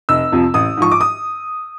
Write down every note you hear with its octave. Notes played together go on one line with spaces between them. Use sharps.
F1 E6
F2 C3 F3
A1 D#6
G#2 F3 C#6
D6
D#6